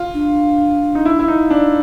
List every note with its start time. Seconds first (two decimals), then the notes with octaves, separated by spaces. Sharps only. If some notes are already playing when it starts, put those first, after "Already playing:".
Already playing: F4
0.14 D4
0.95 D#4
1.05 E4
1.19 E4
1.28 D#4
1.50 D4